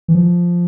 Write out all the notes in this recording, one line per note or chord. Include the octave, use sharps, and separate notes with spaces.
E3
F3